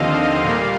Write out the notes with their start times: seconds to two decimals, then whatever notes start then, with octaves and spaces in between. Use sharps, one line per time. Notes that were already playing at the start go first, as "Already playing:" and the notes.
Already playing: D#2 D3 F3 C4 D#5 F5
0.44 A#2 G3 A#3